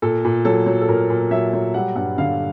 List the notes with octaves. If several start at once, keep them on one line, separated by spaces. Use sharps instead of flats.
A#2 A4
A#2
F#3 A4
F#3
A4
A#2 A#4
A#2
F#3 E5
F#3
G3 F#5
G2 F#5
D3 F5